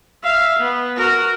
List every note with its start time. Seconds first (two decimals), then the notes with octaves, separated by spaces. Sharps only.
0.23 E5 F5
0.59 B3
0.97 F#4 A#4